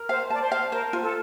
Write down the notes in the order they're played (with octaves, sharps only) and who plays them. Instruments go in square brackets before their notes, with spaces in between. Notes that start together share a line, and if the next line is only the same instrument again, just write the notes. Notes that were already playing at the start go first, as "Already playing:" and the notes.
Already playing: [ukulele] A#4
[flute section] C5 [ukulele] F5
[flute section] D5 [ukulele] A5
[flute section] C5
[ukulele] F5
[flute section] A#4 [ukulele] C5
[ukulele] F4
[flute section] A4